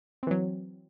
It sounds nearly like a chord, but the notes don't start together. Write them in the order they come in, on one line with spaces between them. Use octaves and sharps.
C4 E3 F#3